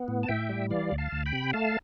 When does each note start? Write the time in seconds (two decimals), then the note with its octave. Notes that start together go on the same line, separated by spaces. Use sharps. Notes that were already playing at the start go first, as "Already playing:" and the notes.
Already playing: B3
0.08 A2
0.23 A5
0.28 A2 E5 G5
0.49 G3
0.70 E3 D5 F5
0.92 D2
0.98 F5 A5
1.12 D2
1.26 G5 B5
1.33 C3
1.53 A3 F5 A5